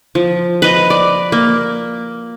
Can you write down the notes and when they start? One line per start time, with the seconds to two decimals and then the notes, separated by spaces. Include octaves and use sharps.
0.15 F3
0.62 B4 D#5 A#5
0.90 D5
1.32 A#3